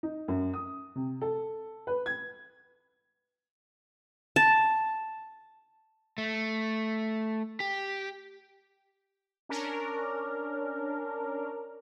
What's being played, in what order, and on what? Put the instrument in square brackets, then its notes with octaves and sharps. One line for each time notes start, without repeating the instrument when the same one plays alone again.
[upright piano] D#4
F#2
D#6
C3
A4
B4
G#6
[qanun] A5
[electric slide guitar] A3
G4
[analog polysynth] C#4 D4 A#4